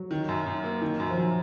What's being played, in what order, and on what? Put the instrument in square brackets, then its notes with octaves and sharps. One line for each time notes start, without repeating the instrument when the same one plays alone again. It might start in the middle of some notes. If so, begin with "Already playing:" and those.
Already playing: [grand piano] F#3
[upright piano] D#3
F#2
F#2
A#3
D#3
F#2
[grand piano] F3
[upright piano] F#2 [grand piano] F#3